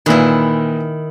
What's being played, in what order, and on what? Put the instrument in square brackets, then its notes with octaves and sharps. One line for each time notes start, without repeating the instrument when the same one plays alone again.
[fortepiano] A#2 E3 [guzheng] D#3 E4